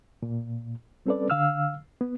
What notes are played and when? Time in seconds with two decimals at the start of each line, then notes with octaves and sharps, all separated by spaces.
0.23 A#2
1.06 G3 C4 C#4 A4 B4 D5
1.30 D3 F5 E6 F6
2.01 B3